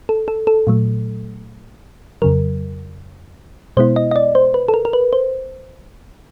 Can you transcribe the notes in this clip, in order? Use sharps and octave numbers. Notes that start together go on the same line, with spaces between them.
A4
A4
A4
A#2 F#3 A3
F2 C#3 F#3 A#4
B2 G#3 B3 E4 C5
D#5
D#5
D5
C5
B4
A4
A#4
A#4
B4
C5